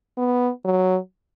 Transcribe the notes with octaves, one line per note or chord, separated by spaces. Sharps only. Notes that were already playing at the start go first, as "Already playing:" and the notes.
B3
F#3